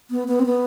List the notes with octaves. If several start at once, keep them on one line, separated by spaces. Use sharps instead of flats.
B3
B3
C4
B3